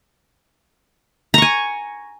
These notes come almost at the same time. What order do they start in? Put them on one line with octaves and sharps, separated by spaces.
A#5 C#6 G#5